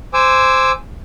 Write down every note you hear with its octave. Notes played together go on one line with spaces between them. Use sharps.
C5 G#5 D6 E6